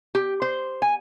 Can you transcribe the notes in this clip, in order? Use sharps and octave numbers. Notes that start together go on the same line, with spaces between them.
G4
C5
G#5